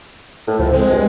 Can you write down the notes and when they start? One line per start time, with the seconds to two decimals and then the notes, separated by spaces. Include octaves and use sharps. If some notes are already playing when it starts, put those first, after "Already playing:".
0.47 A2
0.59 C#2 F3
0.73 G#3 C4
0.91 G2